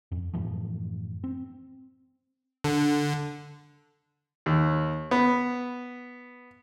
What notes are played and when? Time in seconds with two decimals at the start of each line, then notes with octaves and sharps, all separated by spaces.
0.12 F2
0.33 F#2 A2 E3 F3
1.24 C4
2.64 D3
4.46 D#2
5.11 B3